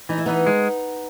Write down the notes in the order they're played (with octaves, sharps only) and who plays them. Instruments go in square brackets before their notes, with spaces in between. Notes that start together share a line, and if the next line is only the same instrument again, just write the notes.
[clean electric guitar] E3 [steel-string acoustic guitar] D#4
[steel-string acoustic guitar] E4
[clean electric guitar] E3 [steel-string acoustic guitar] B3 D#4
[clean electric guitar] G#3